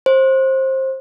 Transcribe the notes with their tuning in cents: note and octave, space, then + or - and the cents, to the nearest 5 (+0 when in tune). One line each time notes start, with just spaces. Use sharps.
C5 +20